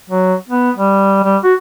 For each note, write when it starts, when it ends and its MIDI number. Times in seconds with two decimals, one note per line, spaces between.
0.10 0.34 54
0.49 0.71 59
0.76 1.21 55
1.24 1.38 55
1.44 1.54 66